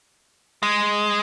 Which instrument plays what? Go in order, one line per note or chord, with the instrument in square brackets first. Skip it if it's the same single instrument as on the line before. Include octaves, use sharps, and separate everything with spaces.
[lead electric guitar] G#3